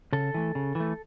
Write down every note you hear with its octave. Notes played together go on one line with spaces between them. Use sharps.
C#3 A4
E3 A3
C#3
E3
A3